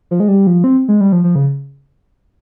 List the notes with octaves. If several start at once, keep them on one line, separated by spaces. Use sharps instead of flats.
F3
G#3
G3
F3
C4
G#3
G3
F3
F3
C#3